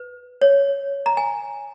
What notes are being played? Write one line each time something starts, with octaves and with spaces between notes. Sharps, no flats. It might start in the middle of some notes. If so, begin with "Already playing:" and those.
Already playing: B4
C#5
A#5
G#5